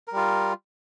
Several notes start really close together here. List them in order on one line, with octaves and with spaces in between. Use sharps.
A#4 G3 F4